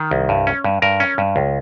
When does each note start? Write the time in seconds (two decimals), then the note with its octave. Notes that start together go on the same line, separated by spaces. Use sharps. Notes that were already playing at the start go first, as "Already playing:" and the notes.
Already playing: D#3
0.11 C2
0.29 G2
0.47 C#4
0.64 G2
0.82 G2 A#4
1.00 C#4
1.18 G2
1.36 C#2